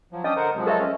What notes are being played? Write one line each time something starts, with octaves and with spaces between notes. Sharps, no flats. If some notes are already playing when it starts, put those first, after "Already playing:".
F3 F#3
C#4 D4 D#5 G5 D#6
D3 A#4 C5 F#5
C3 F3 F#3 G#3
A4 A#4 C#5 D#5 E5 A5
C#4